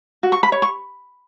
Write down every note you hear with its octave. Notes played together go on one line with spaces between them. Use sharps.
F#4
C#6
B5
C#5
C#6